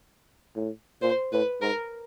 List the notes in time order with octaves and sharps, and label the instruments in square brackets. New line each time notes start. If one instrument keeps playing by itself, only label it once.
[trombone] A2
[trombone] A#2 [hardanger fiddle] C5
[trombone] A2 [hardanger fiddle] B4
[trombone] G#2 [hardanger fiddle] A#4